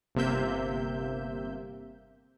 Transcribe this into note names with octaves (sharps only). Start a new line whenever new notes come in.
G1 C3 A#3 E5 G6